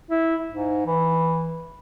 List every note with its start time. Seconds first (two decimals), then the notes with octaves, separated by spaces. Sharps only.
0.11 E4
0.52 G#2
0.86 E3